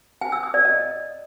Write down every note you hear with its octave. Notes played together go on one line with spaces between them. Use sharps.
G#5
E6
D#6
D5
D#5